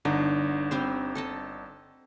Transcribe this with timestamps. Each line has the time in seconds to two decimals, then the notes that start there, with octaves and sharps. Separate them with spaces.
0.05 G1 D3 D4 D#4
0.71 G3 C4 C5
1.15 A4 D#5 A5